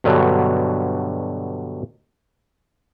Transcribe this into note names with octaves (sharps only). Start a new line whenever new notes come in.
G2 B2 D3 F#3